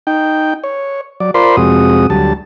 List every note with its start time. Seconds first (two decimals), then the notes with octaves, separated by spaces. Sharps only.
0.07 D#4 G5
0.64 C#5
1.20 F#3 D5
1.34 F4 A#4 C5 D5 B5 C6
1.57 F2 C3 G#3 F#4 D#6
2.10 D2 F#3 G3 A5